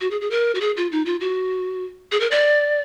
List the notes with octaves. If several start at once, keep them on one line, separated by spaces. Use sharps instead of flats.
F#4
G#4
G#4
A#4
F#4
G#4
F4
D#4
F4
F#4
G#4
A#4
D5